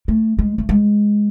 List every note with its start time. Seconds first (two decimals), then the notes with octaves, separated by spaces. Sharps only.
0.08 A3
0.39 G#3
0.58 A3
0.69 G#3